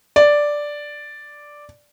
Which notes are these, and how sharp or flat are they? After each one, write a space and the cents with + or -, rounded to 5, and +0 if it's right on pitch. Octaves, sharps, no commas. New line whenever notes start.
D5 +0